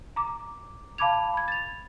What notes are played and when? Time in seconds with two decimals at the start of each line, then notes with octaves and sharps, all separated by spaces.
0.16 A#5 D6
0.98 F5 A5 B5 D6 G#6 F7
1.34 B5 G#6
1.48 A6 F7